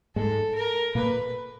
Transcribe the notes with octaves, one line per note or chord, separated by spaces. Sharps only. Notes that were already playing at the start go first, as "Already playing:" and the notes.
G#2 G#3 A4
A#4
A#2 A#3 B4